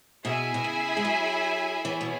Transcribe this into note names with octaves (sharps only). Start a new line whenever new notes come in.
B2 E4 G#4 E5 G#5
B2
C#3
G#3
F#3
E3 B3 E4 G#4 C#5 G#5
B2